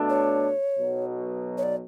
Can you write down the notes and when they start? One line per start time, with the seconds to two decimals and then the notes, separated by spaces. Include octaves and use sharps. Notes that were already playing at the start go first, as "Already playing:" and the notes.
Already playing: B2 A3 D4
0.10 C#5
0.78 B1 B2 F#3
1.58 C#5
1.63 D5